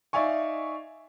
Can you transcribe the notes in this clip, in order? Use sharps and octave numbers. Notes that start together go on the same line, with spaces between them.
D#4 D5 E5 F5 G#5 C#6